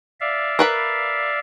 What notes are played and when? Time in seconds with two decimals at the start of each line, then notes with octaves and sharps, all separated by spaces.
0.20 D5 E5 F5
0.59 A#4 B4 B5